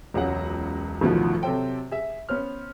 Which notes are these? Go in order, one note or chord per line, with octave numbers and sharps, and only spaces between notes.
E1 C#2 F#3 G#4 F#5
A1 D2 B2 D#3 F3
C3 F#3 A4 C5 G5
G#4 E5
B3 C#4 C5 F6